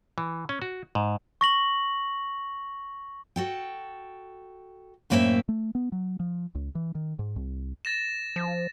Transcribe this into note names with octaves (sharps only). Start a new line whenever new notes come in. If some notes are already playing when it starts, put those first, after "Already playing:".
E3
C#4
F#4
G#2
C#6 A#6 F#7
F#4 A4 G5
F#2 A2 A#3 C4 G#4 E5
A3
B3
F#3
F3
C#2
E3
D#3
G#2
C2
A6 A#6 E7
F3